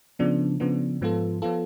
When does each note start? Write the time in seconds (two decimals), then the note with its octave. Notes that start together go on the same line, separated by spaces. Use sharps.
0.19 C#3 F3 B3 D4
0.60 C#3 F3 B3 D4
1.01 G#2 F3 B3 F4 A4
1.42 F3 B3 F4 A4